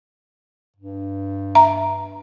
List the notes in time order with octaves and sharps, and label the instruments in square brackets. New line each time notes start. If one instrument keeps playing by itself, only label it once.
[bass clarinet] G2
[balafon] E5 A#5